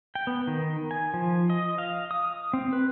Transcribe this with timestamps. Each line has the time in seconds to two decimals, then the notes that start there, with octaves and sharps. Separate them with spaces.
0.15 G5
0.27 B3
0.47 D#3
0.91 G#5
1.14 F3
1.50 D#5
1.78 F5
2.11 D#6
2.53 C4
2.73 B4